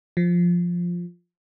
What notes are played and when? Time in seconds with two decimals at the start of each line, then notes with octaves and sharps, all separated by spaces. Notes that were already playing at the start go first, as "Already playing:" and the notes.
0.17 F3